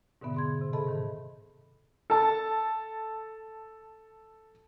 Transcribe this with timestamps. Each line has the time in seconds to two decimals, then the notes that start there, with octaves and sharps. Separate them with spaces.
0.21 G#2 B2 D3 B3 E5
0.35 G#4 C6 G#6
0.61 C3
0.73 G#4 A4 D#5 E5 A5 B5
0.87 G#2 D#3
2.10 A4 A5